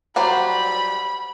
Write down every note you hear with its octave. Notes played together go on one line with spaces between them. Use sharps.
F#3 G3 C5 B5